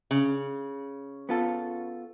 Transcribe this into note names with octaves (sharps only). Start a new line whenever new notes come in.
C#3
B3 F4 A4